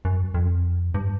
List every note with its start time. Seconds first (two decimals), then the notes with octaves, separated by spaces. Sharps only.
0.05 F#2
0.34 F2
0.94 G2